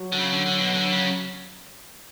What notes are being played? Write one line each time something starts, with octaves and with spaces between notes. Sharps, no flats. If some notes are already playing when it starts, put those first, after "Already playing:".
Already playing: F#3
D3
C#3
D3
D3
B2
D3
C#3